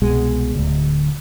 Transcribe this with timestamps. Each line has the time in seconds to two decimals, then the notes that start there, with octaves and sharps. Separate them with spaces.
0.02 C2 B2 G#3
0.54 D1 G#1 D2